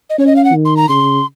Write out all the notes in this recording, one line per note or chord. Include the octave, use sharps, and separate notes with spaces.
D#5
C#4 C#5
D#5
F5
F#5
D#3
C6
A#5
C#3 C6